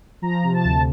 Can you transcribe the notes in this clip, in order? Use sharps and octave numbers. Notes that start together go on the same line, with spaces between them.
F3 A#5
C3
A5
D2